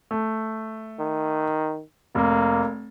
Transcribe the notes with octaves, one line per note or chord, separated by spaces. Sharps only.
A3
D#3
F1 A#3